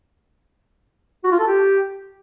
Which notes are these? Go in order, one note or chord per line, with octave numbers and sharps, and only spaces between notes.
F#4
F4
A4
G4